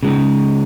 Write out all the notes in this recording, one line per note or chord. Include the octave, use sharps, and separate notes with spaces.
C#3 G#3 D#4